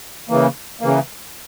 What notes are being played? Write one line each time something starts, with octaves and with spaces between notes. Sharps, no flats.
C#3 E3 A#3
C#3 E3 A#3